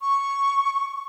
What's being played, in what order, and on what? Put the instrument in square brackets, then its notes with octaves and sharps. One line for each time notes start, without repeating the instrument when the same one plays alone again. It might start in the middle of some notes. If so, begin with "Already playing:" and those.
[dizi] C#6